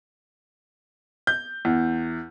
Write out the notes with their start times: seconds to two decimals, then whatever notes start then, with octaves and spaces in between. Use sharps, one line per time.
1.27 G6
1.65 E2